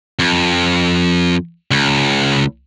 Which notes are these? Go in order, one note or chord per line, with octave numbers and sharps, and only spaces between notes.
F2
C#2